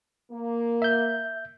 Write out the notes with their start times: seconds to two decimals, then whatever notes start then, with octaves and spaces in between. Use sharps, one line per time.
0.31 A#3
0.82 E5 G6